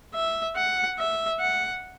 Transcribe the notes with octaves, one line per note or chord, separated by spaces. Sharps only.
E5
F#5
E5
F#5